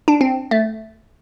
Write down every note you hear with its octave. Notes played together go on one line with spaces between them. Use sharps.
D4
C4
A3